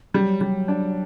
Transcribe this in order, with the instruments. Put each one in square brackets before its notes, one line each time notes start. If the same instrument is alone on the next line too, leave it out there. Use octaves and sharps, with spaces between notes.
[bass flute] F#3 [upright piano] G3
[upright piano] G3
D4